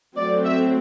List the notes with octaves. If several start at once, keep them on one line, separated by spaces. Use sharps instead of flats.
F#3 A3 C4 D5
E5